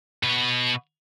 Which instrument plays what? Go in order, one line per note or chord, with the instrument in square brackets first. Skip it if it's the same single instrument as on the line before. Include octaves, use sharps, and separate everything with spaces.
[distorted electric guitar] B2 B4